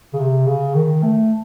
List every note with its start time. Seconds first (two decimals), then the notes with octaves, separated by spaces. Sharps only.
0.14 C#3
0.19 C3
0.46 C#3
0.74 D#3
1.02 A3